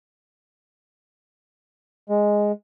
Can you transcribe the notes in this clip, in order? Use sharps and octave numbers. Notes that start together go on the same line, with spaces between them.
G#3